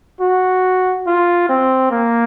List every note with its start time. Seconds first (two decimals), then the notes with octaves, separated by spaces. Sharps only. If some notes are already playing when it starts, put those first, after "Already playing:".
0.21 F#4
1.07 F4
1.49 C4
1.91 A#3